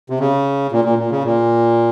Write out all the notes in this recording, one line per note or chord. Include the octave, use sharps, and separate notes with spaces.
C3
C#3
A#2
A#2
A#2
C#3
A#2